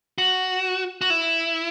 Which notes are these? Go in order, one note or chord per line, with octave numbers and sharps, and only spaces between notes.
F#4
F#4
E4